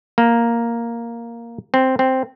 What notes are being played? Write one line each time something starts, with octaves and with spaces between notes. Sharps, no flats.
A#3
C4
C4